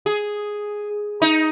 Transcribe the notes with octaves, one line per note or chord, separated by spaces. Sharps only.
G#4
D#4